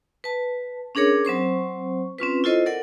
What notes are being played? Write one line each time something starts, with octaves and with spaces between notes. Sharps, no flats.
B4 A5
C#4 D4 G#4 A#4 C#5
F#3 C4 C5 C#6
C4 C#4 F4 B4
E4 F4 A4 C5 D#5
A4 A#4 D5 F#5